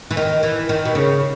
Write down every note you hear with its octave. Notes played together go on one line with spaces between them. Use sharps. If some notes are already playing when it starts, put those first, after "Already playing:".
E3
D#3
E3
D#3
B2
C#3